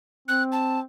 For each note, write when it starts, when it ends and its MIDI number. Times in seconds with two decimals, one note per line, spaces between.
0.28 0.82 60
0.28 0.43 90
0.52 0.80 81